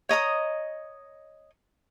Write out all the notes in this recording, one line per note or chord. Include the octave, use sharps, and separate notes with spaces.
C#5 D#5 A#5 D#6